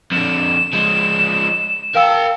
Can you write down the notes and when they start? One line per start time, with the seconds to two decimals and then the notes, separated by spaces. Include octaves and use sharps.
0.12 F2 D3 E7
0.73 F3 G#3
1.95 A#4 F5 G5 A5 E6